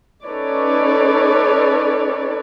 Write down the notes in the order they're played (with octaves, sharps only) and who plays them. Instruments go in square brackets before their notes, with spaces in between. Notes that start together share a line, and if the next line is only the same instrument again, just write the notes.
[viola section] C#4 D#4 A4 B4 C#5 D5